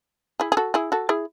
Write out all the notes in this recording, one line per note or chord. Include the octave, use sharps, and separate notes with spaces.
E4 G#4
G#4
F#4 A4
E4 G#4
F#4 A4
E4 G#4